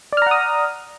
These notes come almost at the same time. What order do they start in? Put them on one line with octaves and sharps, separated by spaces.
D5 F6 A#5 F#5 D#6